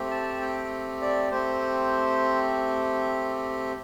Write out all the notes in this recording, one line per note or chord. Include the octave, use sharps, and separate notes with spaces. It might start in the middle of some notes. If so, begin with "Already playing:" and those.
Already playing: A3 C4 G4
A5
G5
D5
A3 C4 G4 C5